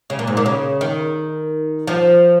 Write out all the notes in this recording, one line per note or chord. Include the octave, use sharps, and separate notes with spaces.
C#3
A#2
G#2
A#2
C#3
D#3
F3